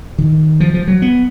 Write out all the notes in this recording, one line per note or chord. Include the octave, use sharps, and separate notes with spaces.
D#3
F3
F3
F#3
B3